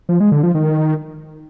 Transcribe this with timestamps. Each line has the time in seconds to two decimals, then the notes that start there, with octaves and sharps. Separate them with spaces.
0.09 F3
0.20 G#3
0.32 D3
0.43 F3
0.55 D#3